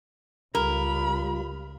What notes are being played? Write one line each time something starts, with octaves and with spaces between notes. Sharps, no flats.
C#2 G3 F4 A#4 B5